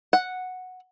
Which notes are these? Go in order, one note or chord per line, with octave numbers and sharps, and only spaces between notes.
F#5